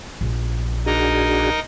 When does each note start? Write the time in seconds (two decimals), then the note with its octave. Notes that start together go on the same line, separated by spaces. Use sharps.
0.21 A#1
0.86 D4 D#4 F#4 G#4 A#4 D#5